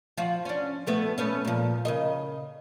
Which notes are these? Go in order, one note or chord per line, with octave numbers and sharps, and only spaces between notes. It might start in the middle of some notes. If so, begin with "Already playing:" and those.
F3 F4 F#4
C#4 D4
F3 A3 B3
A3 B3 C#4
A#2 F3
C#3 A#4 D#5